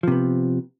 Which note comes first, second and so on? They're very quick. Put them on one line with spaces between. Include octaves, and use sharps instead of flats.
F3 C3 B3